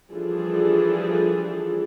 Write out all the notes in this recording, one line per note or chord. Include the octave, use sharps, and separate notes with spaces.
E3 F3 G3 D4 G#4 A4